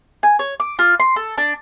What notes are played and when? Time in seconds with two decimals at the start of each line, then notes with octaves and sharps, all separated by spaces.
0.23 G#5
0.39 C#5
0.60 D6
0.79 F4
1.00 C6
1.16 A4
1.38 D4